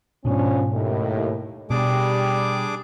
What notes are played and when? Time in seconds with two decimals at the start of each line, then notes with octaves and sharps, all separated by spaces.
0.25 G#2 B2 F3 C#4 D4
0.72 D#2 A2
1.70 B2 G3 D4 G#4 D6